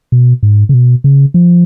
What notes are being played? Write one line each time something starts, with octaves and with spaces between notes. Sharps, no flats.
B2
G#2
C#3
B2
C#3
F3